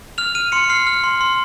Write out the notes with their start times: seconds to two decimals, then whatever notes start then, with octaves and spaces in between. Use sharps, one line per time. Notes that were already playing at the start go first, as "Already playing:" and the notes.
0.18 F6 F7
0.35 F6 D#7
0.52 C6 C#7
0.70 F6 C7
0.87 F6
1.04 C6
1.21 C6